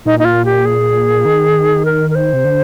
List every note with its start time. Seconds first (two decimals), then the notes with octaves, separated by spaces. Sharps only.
0.06 A#2 D#4
0.19 D#4
0.25 F4
0.45 G4
0.65 G#4
1.25 D#3
1.85 A#4
2.10 A#4
2.15 C5
2.33 C3
2.45 D3